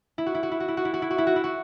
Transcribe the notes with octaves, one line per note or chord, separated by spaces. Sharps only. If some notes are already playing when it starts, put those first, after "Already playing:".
E4
F#4
E4
F#4
E4
F#4
E4
F#4
E4
F#4
E4
F#4
E4
F#4
E4
F#4